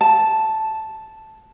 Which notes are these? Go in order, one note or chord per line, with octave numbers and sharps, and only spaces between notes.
A5